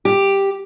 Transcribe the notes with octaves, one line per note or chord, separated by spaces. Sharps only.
G4